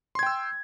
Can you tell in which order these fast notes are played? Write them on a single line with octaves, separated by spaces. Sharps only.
C6 G#6 G5 E6